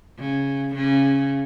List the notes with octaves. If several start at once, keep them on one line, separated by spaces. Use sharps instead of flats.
C#3
C#3